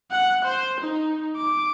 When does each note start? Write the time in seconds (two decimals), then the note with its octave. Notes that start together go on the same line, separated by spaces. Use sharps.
0.11 F#5
0.45 C5
0.81 D#4
1.36 D6